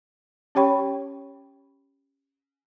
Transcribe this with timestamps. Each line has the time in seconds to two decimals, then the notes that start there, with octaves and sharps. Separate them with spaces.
0.55 C#4 G4 C#5 G5 B5 C#6